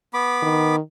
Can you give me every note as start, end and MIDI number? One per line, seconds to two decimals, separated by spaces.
0.14 0.76 59
0.14 0.76 83
0.14 0.76 86
0.43 0.79 51